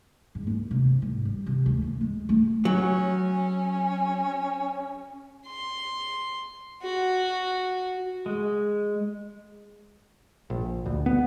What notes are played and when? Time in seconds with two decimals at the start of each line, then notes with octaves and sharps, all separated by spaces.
0.35 G#2
0.47 D#2
0.71 C3
0.87 C#4
1.02 G#1
1.25 G3
1.46 C3
1.66 D2
1.82 A#3
2.01 G#3
2.29 A3
2.65 F#3 C#4
5.48 C6
6.83 F#4
8.26 G#3
10.50 A#1
10.86 D2
11.06 B3